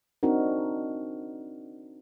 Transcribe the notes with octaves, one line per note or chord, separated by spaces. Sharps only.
C4 D4 D#4 F#4 A#4